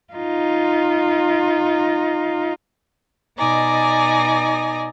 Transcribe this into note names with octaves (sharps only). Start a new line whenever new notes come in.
D#4 F4
B2 D#4 D5 G#5 A#5